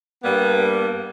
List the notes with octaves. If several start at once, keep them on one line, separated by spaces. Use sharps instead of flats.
G2 G3 A#3 B3